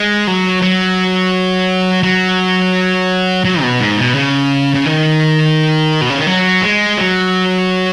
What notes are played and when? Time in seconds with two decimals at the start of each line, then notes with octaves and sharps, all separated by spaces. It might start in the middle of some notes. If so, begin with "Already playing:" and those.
Already playing: G#3
0.27 F#3
0.62 F#3
2.03 F#3
3.45 F#3
3.62 B2
3.80 G#2
3.97 B2
4.15 C#3
4.75 C#3
4.86 D#3
6.01 B2
6.10 C#3
6.18 D#3
6.27 F#3
6.62 G#3
6.97 F#3